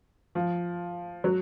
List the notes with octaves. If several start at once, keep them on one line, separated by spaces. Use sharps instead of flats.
F3
F#3